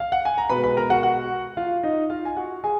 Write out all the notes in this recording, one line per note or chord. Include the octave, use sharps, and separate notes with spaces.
F5
F#5
G#5
A#5
B2 G#3 B4 B5
B4 B5
A#4 A#5
F#4 F#5
F#4 F#5
F4 F5
D#4 D#5
F4 F5
G#5
F#4 F#5
G#4 G#5